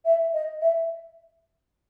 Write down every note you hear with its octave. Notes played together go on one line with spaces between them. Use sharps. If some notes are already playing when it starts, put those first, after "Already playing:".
E5
D#5
E5